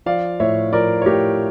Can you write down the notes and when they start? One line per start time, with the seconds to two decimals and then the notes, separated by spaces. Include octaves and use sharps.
0.06 F3 D5 F5
0.40 A2 C#5 E5
0.73 F3 A#4 D5
1.02 C#5
1.06 A2 G4 A#4